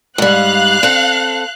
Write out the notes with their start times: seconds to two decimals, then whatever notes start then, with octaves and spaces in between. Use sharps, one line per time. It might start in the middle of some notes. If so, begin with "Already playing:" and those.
0.18 G#2 G3 F5 F#6
0.83 C4 A4